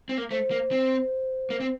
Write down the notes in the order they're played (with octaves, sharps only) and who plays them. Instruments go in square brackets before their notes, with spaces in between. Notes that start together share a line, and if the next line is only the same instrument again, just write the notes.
[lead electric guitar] C4
A#3
[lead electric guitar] A3 [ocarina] C5
[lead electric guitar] A#3
C4
A#3
C4